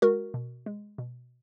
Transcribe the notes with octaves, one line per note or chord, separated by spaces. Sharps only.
G#3 F#4 A#4
B2
G#3
B2